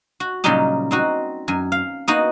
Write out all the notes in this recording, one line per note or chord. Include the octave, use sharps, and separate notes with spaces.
F#4
A#2 C#3 F#3 G3 D#4 G4
C4 D#4 F#4
F#2 G#5
F5
A#3 B3 D#4 F#4